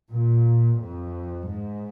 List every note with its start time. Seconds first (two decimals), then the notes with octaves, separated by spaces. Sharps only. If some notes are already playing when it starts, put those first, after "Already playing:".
0.11 A#2
0.79 F2
1.47 G#2